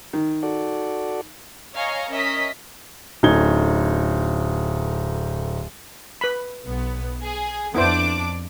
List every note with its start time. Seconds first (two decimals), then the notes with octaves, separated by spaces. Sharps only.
0.13 D#3
0.43 F#4 A4 D5
1.75 C#5 D#5 F5 G#5 A#5 C#6
2.10 C#4 A#4 D#5 E5 D#6 B6
3.23 D1 A3 C#4 D#4 G#6 G7
6.21 B4 B5
6.66 B1 B3
7.23 G#4
7.75 F2 B3 D4 E4 C5 D6